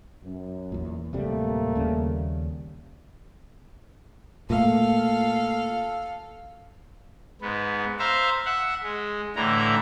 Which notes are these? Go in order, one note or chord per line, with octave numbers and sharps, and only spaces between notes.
F#2
E2 A#2
D1 A2 C3 G3 A3 A#3
D#2 C#3 G3
A#2 A3 A4 F5
G#2 B3
C5 E5 F5 A#5
E5 F#5
G#3
A2 D3 E3 A#5